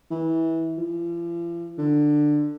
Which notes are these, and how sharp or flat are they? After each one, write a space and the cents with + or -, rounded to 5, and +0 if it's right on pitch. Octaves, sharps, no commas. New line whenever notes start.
E3 -20
F3 -45
D3 +15